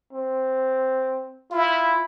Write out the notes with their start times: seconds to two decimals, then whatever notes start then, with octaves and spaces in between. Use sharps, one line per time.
0.13 C4
1.51 E4 F4